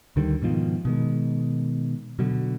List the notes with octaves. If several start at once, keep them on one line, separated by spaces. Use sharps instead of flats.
D2 D3 D#3 G3
G#2 B2 D#3 F3
B2 D#3 G#3
B2 D3 F#3